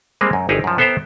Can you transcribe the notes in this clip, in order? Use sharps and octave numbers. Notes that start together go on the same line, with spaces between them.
G3 G#3 A#3 C4
F#2
G1 D#4 G4 G#4
F#2 F3
B3 A4 C5 E5 G5 A#5